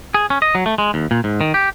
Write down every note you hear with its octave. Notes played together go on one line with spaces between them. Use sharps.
G#4
C#4
D#5
F#3
A3
G#3
D#2
A#2
G#2
D#3
G4